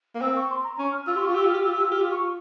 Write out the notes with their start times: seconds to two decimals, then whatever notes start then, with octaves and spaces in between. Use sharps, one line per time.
0.15 A#3
0.22 C4 E6
0.36 C#6
0.50 C6
0.64 A#5
0.79 C#4 C#6
0.92 F6
1.06 F4 E6
1.16 G4 C6
1.21 C#6
1.26 F4
1.35 G4 E6
1.45 F4
1.50 F6
1.54 G4
1.64 F4 E6
1.74 G4
1.78 E6
1.82 F4
1.92 G4 F6
2.02 F4
2.11 C#6